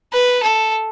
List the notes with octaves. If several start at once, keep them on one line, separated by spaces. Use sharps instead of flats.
B4
A4